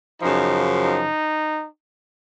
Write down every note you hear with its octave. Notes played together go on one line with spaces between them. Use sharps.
F#2 C#3 F3 D#4
D#4